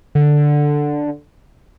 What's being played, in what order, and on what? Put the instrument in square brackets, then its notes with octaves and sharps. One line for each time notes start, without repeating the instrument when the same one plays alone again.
[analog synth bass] D3